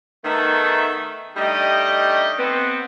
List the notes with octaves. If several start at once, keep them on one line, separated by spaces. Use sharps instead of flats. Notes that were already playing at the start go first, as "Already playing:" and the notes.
D#3 A3 B3 D#4 A4 E5
G3 A3 D4 D#4 G4 D#5
B3 C4